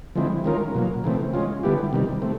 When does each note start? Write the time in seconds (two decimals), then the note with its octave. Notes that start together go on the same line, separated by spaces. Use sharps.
0.15 D3 F3 G#3 C4 E4
0.44 D#3 G#3 C#4 F4 A#4
0.75 B2 F#3 A#3
1.04 C#3 E3 A3 C4
1.33 G#3 C#4 F4
1.63 D3 G3 B3 E4 G4
1.93 C3 D#3 G3
2.22 A3 C4